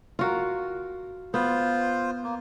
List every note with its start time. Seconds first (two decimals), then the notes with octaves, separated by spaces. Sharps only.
0.19 F4 F#4 A#4
1.34 B3 F4 C5
2.24 A#3